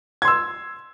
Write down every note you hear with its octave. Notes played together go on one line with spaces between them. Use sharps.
C6 E6 G#6